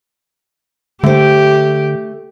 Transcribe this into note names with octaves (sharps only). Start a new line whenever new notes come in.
D3 A3 G4 C5